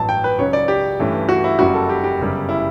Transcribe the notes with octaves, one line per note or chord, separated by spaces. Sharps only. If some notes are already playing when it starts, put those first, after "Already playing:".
Already playing: A1 G2 F#3 A5
G5
B4
C#2 C#3 F#3 C#4 C#5
D5
G4
G2 E3 A3 C#4
F#4
E4
F#1 F#2 C#3 G3 F#4
A4
G4
G4
G1 F#2 C#3 G3
E4